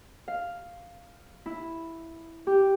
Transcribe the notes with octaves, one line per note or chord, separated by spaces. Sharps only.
F5
E4
G4